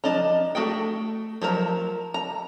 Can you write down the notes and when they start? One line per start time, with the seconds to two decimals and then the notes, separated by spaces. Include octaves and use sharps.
0.04 F3 D4 D#5 A#5
0.55 A3 F#4 G#4 G5
1.42 F3 F#3 A#4 A#5
2.14 A#5